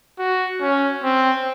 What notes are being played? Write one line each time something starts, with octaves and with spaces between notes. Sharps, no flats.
F#4
C#4
C4